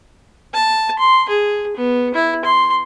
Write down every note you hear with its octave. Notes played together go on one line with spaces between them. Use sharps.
A5
C6
G#4
B3
E4
C6